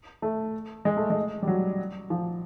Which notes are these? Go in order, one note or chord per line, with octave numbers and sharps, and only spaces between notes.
A3
G#3
A3
G#3
G3
F#3
F3